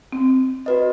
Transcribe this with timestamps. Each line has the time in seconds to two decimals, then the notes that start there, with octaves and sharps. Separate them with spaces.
0.12 C4
0.66 F#4 B4 D#5